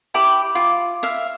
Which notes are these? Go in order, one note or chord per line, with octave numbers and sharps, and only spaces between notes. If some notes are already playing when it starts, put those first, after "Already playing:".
E4 G4 B5 D6
F4 D6
E5 F5